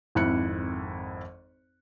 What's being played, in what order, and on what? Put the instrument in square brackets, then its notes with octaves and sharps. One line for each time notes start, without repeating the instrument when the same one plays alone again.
[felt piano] G#1 F2 E4 F#6 C#7